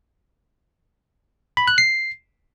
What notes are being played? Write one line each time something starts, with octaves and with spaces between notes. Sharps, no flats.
B5
F#6
C7